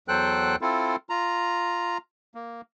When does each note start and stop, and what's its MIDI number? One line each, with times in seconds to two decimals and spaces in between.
0.08 0.56 40
0.08 0.56 54
0.08 0.56 69
0.08 0.56 72
0.08 0.56 79
0.08 0.56 90
0.61 0.96 60
0.61 0.96 64
0.61 0.96 65
0.61 0.96 69
1.09 1.98 65
1.09 1.98 82
2.35 2.61 58